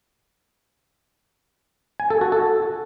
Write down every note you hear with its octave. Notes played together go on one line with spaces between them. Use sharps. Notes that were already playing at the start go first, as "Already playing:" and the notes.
G#5
A4
F#4
A4